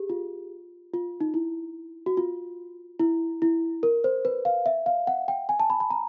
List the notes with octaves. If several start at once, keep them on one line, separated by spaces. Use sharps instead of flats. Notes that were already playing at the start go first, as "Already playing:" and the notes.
Already playing: G4 G#4
F4
F4
D#4
E4
F#4
F4
E4
E4
A#4
C5
B4
F5
E5
F5
F#5
G5
G#5
A5
B5
B5
A#5